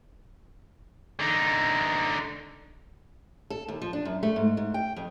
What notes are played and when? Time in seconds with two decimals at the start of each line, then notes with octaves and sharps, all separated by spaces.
1.19 D3 D#4
3.50 A4
3.68 D#2
3.82 F3
3.93 D4
4.05 F#2
4.23 A3
4.36 G#2
4.57 G#2
4.74 G5
4.96 F2